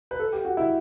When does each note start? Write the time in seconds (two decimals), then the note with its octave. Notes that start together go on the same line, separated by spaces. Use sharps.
0.11 B4
0.19 A4
0.33 G4
0.45 F#4
0.57 E4